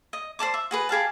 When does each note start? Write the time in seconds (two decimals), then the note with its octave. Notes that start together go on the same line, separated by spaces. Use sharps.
0.13 D#5
0.39 C5 D5 A5 D6
0.54 E5
0.71 F#4 G#4 B4
0.89 G4 G#4 F5 A5